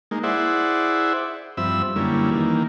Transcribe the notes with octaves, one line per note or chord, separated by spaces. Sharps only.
G#3 A#3 D#4
E4 G#4 C5 D5 E5 F#5
G2 F3 C4 E5 B5 E6
F#2 D3 G3 A#3 C#4 E4
D#3 E3 A#3